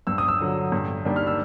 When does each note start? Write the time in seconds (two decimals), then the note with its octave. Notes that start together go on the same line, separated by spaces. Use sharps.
0.07 G2 E6
0.18 D#6
0.28 E6
0.40 D3 F#3
0.72 G2
1.05 D#3 G3 A#3 D4
1.16 F6
1.27 E6